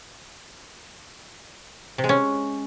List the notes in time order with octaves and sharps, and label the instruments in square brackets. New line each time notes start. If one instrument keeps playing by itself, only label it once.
[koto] C3
G#3
C#4